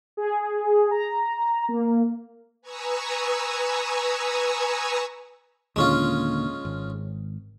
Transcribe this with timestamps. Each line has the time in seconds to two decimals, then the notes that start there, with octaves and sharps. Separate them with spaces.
0.17 G#4
0.91 A#5
1.69 A#3
2.62 B4 G#5 A#5 C#6 D#6 E6
5.76 D#2 A#2 D3 G#3 C#4 F4
6.65 G#1